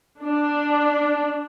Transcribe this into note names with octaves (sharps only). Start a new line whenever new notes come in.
D4